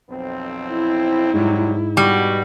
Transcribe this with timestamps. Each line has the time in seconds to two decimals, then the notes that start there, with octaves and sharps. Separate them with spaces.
0.10 B1 F2 C4
0.71 E4
1.33 G#2 C3 F#3 G3
1.97 B2 G3 F#4